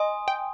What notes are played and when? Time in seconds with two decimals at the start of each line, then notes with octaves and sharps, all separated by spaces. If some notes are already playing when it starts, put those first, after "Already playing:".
Already playing: D#5 G#5 C6 D#6
0.28 G5